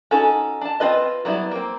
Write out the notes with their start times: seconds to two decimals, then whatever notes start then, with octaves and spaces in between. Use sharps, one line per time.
0.11 C#4 D#4 F#4 A4
0.61 D4 A5
0.80 C4 F4 B4 D#5
1.25 F#3 G3 B3 E4
1.51 A#3 C4